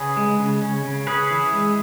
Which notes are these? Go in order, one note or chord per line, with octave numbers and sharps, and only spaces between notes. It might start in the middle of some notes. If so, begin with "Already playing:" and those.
Already playing: C#3 C#4 G#4 B4
G#3
C#3
C#4
C#3
C#4 G#4 B4
E3
G#3